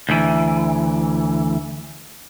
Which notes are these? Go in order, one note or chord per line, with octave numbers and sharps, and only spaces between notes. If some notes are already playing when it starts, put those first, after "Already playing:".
D2 E3